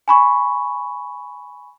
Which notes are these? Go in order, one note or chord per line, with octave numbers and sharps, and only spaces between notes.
G#5 B5 C#6